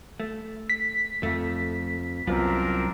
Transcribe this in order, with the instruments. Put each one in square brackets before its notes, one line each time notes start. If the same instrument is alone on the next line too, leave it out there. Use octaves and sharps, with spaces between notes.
[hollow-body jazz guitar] A3
[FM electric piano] B6
[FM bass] F2 [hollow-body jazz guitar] A3
[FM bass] C2 [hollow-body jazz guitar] F#2 B3 F4 [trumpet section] C4 D4 A#4